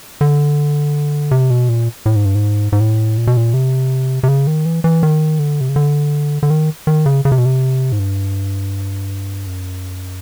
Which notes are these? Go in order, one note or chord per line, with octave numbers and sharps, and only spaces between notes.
D3
C3
B2
A#2
A2
G#2
G2
G#2
G#2
A2
A#2
B2
A#2
C3
C3
C#3
D#3
E3
E3
D#3
D3
C3
C#3
D3
D3
D#3
D#3
C#3
C#3
C3
B2
C3
G#2
G2
F#2